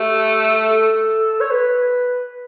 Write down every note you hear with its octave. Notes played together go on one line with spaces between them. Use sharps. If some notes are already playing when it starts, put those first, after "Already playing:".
Already playing: A3 G4
A4
C#5
B4